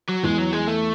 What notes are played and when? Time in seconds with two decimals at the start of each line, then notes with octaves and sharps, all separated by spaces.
0.09 F#3
0.23 E2 E3 G#3
0.38 F#3
0.53 G#3
0.68 A3